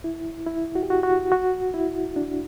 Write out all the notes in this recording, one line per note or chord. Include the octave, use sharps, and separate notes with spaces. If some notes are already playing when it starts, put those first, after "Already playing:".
E4
E4
F#4
G4
F#4
F#4
F#4
E4
D4